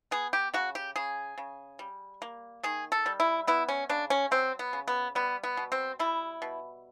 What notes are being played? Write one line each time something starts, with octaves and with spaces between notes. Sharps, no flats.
B3 G#4
G4
C#3 F#4
G4
C#3 G#4
C#3
G3
A#3
D#3 G#4
A4
G3
E4
B3 E4
C#4
C#3 D4
C#4
F#3 C4
B3
C#3
B3
G3 B3
B3
B2
C4
G3 E4
B2